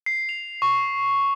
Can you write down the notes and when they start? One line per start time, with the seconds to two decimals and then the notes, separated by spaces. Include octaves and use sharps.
0.06 C7
0.29 F7
0.62 C#6